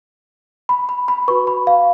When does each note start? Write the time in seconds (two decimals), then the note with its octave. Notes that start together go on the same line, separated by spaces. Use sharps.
0.69 B5
0.89 B5
1.08 B5
1.28 F#4 B4 C#6
1.47 B5
1.67 F5